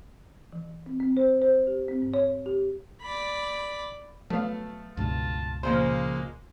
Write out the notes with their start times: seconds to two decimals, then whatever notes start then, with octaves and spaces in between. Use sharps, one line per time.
0.53 E3
0.86 C4
1.00 C4
1.17 C5
1.42 C5
1.67 G4
1.88 C4
2.02 G#2
2.14 C#5
2.46 G4
3.01 D5 B5
4.30 F#3 A3 B3 F5
4.97 C#2 G2 B2 F4 A5
5.63 A#2 C#3 F3 G#3 A#3 C5